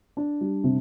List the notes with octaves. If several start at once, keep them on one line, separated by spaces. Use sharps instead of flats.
D4
G3
C3